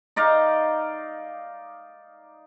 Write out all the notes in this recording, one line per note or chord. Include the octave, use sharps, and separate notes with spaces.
D#4 D5 D#5 F5